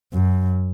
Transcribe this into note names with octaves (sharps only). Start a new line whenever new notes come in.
F#2